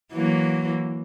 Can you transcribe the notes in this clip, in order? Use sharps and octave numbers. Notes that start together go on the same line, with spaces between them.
E3 F#3 A#3